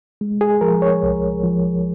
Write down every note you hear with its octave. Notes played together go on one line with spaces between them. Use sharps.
G#3
G#4
F3 A#4
C#5
C2
F3